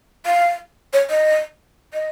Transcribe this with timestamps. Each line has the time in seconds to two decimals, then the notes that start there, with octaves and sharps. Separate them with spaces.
0.26 F5
0.93 C#5
1.10 D#5
1.94 D#5